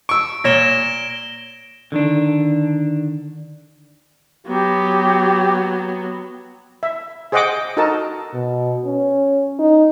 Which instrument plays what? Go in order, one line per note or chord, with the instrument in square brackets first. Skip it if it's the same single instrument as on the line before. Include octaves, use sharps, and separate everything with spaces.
[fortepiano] C#6 E6 [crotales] D7
[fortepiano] A#2 C#5 [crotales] A#6 E7 G7
[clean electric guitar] D3 D#3 D4
[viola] F#3 B3 [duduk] G4
[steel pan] E5
G#4 C5 D#5 F#5 G5 D6
D#4 F#4 A4 A#4 D#5 A5
[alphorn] B2
C#4
D#4